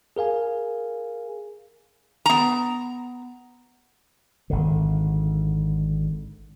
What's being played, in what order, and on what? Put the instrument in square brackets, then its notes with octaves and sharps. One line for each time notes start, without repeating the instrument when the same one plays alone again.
[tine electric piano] G#4 A#4 F5 G#5
[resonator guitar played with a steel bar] B3 A#5
[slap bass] G#1 D3